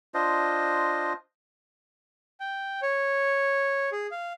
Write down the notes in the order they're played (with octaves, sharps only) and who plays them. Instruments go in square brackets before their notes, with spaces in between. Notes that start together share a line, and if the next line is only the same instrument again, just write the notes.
[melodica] D4 F4 C5 D#5
[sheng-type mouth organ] G5
C#5
G#4
F5